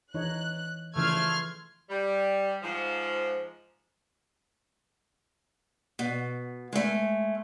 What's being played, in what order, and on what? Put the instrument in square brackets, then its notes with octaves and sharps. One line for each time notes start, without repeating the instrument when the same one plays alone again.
[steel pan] E3 D#4 C#5 [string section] F#6
[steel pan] C#3 E3 F3 [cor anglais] A3 [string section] C6 F6 G#6
[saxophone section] G3
G#2 F3
[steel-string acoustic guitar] B2
G#3 A3